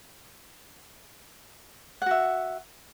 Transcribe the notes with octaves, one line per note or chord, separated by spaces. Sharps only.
F#4 E5 F#5